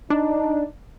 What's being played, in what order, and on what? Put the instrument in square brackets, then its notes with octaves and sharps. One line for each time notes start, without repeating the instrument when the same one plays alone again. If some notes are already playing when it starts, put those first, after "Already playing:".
[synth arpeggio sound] D4 [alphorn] D#4